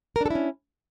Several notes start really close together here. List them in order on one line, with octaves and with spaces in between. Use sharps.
A#4 D4 A4 E4 C#4